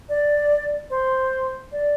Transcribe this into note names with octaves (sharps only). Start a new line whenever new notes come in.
D5
C5
D5